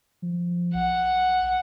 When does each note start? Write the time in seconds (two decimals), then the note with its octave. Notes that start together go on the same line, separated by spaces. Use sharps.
0.22 F3
0.74 B1 F#5